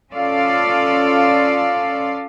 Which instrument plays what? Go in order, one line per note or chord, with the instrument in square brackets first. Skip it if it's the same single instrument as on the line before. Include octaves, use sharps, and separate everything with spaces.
[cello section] C#4 F4 A4 D5 F5